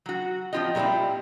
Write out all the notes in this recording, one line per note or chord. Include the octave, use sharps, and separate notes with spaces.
F#3 F#4
F3 C4 F4 G4 D#5
A#2 G3 B3 C4 E4